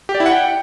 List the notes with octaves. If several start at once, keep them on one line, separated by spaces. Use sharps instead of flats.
G4
D5
E4
F#5
G5